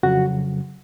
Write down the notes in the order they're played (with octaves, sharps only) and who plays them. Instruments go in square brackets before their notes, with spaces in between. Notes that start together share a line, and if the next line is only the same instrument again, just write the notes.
[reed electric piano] F2 C#3 F#3 F#4 F#5